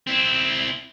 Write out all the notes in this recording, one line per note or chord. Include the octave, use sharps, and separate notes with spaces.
C4 E4